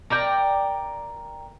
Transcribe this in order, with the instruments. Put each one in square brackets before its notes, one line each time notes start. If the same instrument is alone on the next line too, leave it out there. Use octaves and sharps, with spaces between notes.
[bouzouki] A#4 D5 G5 A#5